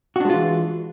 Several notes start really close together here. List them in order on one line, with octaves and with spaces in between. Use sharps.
F#4 D4 G#3 F4 E3